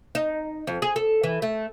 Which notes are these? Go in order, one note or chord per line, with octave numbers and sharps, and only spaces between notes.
D#4
F2
G#4
A4
E3
A3